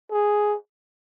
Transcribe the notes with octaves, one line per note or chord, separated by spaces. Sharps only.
G#4